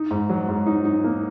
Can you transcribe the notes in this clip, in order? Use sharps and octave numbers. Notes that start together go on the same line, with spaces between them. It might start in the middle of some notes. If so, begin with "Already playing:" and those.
Already playing: D#4
G#2
F#3
G#2
D#4
D#4
A#3